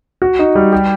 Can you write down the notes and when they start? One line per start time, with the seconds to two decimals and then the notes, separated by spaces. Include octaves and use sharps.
0.22 F#4
0.39 D#4
0.55 G3
0.73 G4